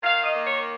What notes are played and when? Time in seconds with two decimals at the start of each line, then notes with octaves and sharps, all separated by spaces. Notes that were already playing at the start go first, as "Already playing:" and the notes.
0.03 D#3 F5
0.24 D#5
0.35 A#3
0.46 C#5